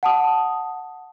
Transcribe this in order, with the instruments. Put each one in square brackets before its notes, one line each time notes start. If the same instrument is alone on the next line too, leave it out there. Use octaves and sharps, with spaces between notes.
[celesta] F#5 A5 D#6